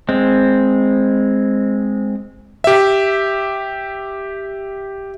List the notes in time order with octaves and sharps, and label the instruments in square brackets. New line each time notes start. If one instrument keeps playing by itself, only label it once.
[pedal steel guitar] G#3 C4
[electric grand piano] G4 E5